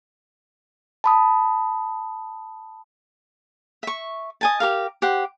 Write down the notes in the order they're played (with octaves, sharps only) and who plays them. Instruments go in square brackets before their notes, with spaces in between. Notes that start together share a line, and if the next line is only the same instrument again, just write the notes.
[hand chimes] A5 B5 D#6
[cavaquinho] E5 C#6
D#5 G#5 A5
G4 A#4 F5
G4 C5 F#5